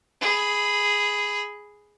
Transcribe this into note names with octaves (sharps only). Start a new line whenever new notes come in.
G#4 B5